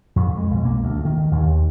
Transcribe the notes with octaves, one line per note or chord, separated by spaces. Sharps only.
F2
G#3
B1
A#3
D2
D#3
D#2